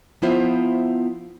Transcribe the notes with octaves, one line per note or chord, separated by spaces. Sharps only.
F3 B3 E4 F4 C5 E5